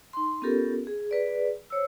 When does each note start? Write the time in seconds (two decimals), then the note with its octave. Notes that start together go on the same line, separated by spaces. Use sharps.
0.13 D#4 C6
0.42 B3 C#4 F4 G4 A4 A#4
0.87 G#4
1.11 G#4 B4 D5
1.70 C5 C#5 E6